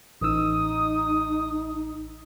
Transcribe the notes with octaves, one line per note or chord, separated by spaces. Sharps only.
A1 D#4 D#6 E6